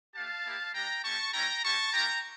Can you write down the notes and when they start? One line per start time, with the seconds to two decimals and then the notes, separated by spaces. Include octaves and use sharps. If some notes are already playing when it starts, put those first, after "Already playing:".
0.15 A3 D4 G4 F5 A5
0.45 A#3 E4 G4
0.74 G3 D4 G4 G5 A#5
1.04 A3 C#4 G4 A5 C#6
1.34 G3 C#4 E4 G5 A#5
1.63 G3 C#4 G4 A5 C#6
1.93 A#3 E4 G4 G5 A#5